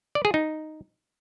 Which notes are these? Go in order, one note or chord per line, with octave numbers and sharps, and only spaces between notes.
D5
G#4
D#4